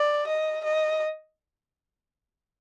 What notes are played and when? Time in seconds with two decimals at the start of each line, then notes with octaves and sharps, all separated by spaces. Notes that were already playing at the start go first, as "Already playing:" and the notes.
Already playing: D5
0.28 D#5
0.65 D#5